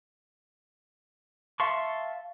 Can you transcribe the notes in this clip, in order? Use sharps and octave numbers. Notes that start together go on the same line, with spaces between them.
E5 F5 A5 C6 C#6